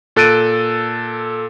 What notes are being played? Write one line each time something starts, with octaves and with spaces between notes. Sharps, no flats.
A#2 A4 F#6 A6 D7 D#7